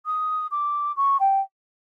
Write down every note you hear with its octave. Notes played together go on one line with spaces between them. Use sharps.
D#6
D6
C#6
G5